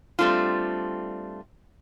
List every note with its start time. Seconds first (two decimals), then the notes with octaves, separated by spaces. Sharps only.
0.19 G3 A3 C4 D4 F4